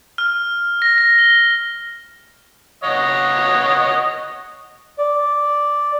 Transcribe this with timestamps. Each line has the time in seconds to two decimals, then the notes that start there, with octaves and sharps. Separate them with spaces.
0.18 F6
0.82 A#6
0.98 A#6
1.19 G7
2.84 C#5 D#5 F#5
4.99 D5